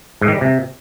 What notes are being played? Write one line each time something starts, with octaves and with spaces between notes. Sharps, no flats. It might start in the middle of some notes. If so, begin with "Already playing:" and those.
G#2
D#3
G3
C3